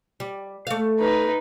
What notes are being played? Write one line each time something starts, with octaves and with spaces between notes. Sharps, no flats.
G3
A3 F5
D#4 B4